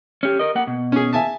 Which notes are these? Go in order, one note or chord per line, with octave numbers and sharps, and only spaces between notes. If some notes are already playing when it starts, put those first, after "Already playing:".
C#4 G4
A#4 D#5
A#3 F#5
B2
C#4 G#4
E5 G#5 A5